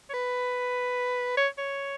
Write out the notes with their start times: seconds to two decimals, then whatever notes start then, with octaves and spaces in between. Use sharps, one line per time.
0.09 C#5
0.14 B4
1.37 C#5
1.58 C#5